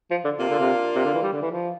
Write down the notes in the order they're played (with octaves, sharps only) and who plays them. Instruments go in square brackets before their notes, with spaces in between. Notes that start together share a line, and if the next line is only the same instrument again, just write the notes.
[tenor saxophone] F3
D3
[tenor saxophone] C3 [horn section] A#3 D4 F4
[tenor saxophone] D3
C3
C3
D3
E3
G3
D3
E3
F3